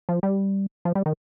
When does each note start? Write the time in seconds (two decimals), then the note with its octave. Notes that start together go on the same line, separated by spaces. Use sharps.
0.09 F3
0.23 G3
0.85 F3
0.95 G3
1.06 D#3